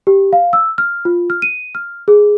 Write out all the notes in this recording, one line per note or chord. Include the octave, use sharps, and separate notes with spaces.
G4
F5
E6
F6
F4
F6
D#7
F6
G#4